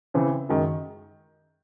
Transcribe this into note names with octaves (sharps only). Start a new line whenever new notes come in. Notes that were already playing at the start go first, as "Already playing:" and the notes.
C#3 E3 C4
F#2 D#3 G#3